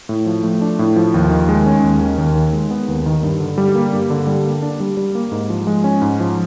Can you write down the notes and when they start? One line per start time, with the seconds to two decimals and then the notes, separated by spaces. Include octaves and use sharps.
0.09 A2
0.26 F3
0.43 A3
0.62 D4
0.79 A2
0.96 F3
1.14 D#2
1.31 D#3
1.49 G#3
1.66 C#4
1.84 D#2
2.01 D#3
2.18 D#2
2.35 D#3
2.53 G#3
2.71 B3
2.88 D#2
3.06 D#3
3.23 G2
3.40 D3
3.58 G3
3.75 A#3
3.93 G2
4.10 D3
4.27 G3
4.45 A#3
4.62 D4
4.80 G3
4.97 G3
5.15 A#3
5.32 G#2
5.50 F3
5.67 G#3
5.84 C#4
6.02 G#2
6.20 F3